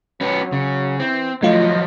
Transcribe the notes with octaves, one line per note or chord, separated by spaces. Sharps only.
F#3 C#4 B4
C#3
E3 C4
A1 F3 F#3 A3 E4 F4 D#5